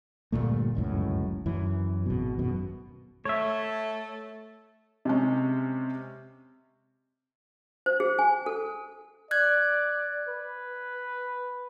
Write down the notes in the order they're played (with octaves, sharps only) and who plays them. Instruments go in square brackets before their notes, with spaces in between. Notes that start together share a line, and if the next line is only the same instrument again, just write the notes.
[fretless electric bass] G1 D#2 A#2 A3
G1 C#2 F#2 A2
F#2 E3
G#1 B2
F#2 B2
[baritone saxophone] A3 [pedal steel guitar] C#5 E5
[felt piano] C3 G#3 C#4
[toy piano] C5
G#4
G#5
A4
[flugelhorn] D5 [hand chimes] F#6 G#6
[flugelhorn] B4